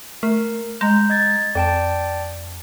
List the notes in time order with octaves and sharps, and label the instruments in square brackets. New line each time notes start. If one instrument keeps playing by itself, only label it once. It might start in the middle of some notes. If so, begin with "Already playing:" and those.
[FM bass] A3 [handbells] A#4
[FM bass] G#3 [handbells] A#5 G6
[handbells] D#5 G#6 A6
[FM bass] F2 [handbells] D5 G5 A5